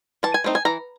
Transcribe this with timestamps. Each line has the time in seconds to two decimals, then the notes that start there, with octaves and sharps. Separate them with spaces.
0.23 E3 A5
0.34 G#5
0.44 A3 C4 D#4
0.55 G#5
0.65 E3 A#5